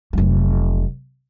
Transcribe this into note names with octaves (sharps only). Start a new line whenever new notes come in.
F1 F#3